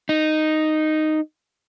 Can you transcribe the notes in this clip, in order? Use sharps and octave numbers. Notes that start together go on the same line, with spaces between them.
D#4